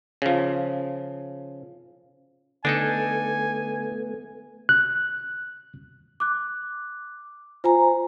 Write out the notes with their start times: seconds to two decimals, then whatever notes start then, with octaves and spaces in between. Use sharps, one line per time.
0.22 C#3 F3
2.65 D3 A3 B3 D4 D#4 A4 G#5
4.69 F#6
6.20 D6 F#6
7.64 F4 C5 G#5 A#5